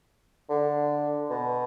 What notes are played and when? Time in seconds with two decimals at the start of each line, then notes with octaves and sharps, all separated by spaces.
0.50 D3
1.30 B2